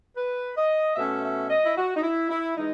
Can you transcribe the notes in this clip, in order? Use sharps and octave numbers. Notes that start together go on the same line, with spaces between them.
B4
D#5
B2 A3 C#4 E5
E5
D#5
E4
F#4
D#4
E4
E4
E3 G#3 D#4